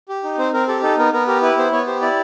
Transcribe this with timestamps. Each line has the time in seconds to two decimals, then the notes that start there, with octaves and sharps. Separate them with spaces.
0.09 G4
0.24 D#4
0.38 C4 C5
0.54 C4 A#4
0.68 G4 A4
0.83 D#4 A4
0.98 B3 A#4
1.13 B3 A#4
1.27 G4 A#4
1.42 E4 B4
1.57 B3 C5
1.72 B3 C#5
1.87 G4 C5
2.02 E4 D5